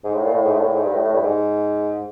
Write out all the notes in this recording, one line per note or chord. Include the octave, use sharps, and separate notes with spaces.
G#2
A2
A#2
A2
G#2
A2
A#2
A2
G#2
G2
A2
A2
G2
G#2